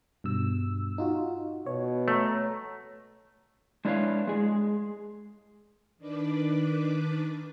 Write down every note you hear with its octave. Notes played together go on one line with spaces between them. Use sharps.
G2 B2 E6
D#4 F4 F#4
B2 C#5
A3 C#5 A#5
G#3 D4 E4 B4 C#5 F5
G#3 G#4
D#3 D4 B4 D6